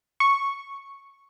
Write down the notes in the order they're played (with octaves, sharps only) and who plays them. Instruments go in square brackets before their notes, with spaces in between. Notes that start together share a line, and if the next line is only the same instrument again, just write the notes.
[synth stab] C#6